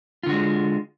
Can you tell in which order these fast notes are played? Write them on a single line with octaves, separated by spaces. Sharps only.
F4 D3 F#4 G#3